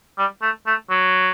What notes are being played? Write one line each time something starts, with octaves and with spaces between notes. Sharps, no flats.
G3
A3
A3
F#3